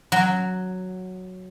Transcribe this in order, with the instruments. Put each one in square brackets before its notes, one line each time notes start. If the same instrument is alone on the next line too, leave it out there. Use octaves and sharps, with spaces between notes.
[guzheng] F#3